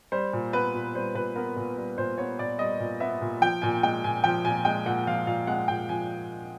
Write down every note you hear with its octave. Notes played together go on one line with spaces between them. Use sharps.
G3 C5
A#2
B3 B4
A#2
G3 C5
A#2 B4
B3 A#4
A#2
G3
A#2 C5
B3 C#5
A#2 D5
G3 D#5
A#2
B3 E5
A#2
F3 G5
A#2 G#5
G#3 G5
A#2 G#5
F3 G5
A#2 G#5
G#3 G5
A#2 F#5
F3 F5
A#2 F5
G#3 F#5
A#2 G5
F3 G#5